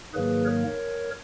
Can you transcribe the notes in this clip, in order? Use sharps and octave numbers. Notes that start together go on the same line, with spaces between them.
G#2 D#3 F#3 A#3 G#4 B4
A#4 C#5